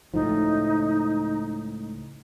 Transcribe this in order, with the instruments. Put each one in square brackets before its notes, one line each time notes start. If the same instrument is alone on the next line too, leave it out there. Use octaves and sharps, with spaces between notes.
[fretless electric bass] C#2 A2 F3 [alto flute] D#4